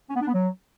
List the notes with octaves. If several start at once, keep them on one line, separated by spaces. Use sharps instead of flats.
C#4
B3
D4
B3
F#3